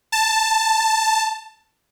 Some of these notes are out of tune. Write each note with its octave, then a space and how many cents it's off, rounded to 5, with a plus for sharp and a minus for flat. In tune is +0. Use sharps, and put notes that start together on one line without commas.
A5 +5